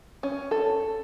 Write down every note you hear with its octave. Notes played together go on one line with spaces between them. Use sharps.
C#4
A4